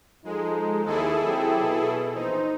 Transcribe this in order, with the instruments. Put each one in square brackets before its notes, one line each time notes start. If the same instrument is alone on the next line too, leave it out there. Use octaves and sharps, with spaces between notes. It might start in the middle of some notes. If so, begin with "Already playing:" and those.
[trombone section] F3 D#4 A4 [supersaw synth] G#3
[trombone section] D#2 [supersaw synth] E4 G#4 A4
[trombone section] F#3 C4 G4
B2
[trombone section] A#1 E3 C5 [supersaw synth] D#4